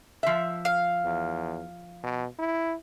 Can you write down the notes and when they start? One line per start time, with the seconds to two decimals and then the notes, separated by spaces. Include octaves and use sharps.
0.23 F3 E5
0.65 F5
1.05 E2
2.04 B2
2.39 E4